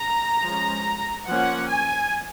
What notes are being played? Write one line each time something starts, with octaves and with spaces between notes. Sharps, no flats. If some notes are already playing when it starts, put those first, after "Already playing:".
Already playing: A#5
F3 G#3 C#4
F3 A#3 C#4 F#5
G#5